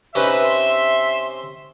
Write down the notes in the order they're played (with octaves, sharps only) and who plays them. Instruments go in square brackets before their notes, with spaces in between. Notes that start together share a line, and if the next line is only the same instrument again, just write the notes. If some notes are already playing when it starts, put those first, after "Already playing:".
[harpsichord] C3 C#4 D#4 [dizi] B4 [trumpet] E5
[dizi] C6